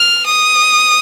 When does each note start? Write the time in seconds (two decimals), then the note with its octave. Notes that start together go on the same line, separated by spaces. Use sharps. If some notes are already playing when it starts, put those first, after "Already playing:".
Already playing: F6
0.26 D#6